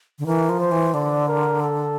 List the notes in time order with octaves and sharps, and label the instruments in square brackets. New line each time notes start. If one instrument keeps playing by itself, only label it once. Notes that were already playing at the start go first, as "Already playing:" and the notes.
[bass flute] D3
[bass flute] E3 [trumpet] A#4
[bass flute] F3
[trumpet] C5
[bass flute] E3
[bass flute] D3 [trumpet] D5
[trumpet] A#4
A4